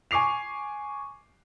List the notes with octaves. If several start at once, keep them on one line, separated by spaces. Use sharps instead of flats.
G#5 C#6 D6 C7 F7